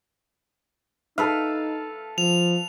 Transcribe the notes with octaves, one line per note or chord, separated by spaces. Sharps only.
D#4 A4 B4 F5
F3 F7